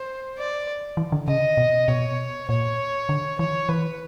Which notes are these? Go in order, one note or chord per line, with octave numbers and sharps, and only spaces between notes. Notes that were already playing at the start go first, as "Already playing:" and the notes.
Already playing: C5
D5
E3
D3
C#3 D#5
B2
B2 C#5
A#2 C#5
D3
E3 C#5
E3 B4